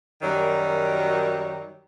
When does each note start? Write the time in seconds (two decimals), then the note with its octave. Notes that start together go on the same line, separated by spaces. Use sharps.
0.22 F#2 D#3 F#3 G3